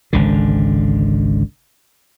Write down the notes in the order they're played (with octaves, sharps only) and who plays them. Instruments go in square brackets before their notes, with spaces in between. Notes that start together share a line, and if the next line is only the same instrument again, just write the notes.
[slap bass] G#1 C#2 D3